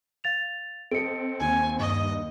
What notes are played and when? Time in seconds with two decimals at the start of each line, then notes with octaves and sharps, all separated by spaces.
0.24 F5 A6 F7
0.91 C4 A4 D#5 C#7 D7
1.40 D#2 G#5
1.80 G2 D#5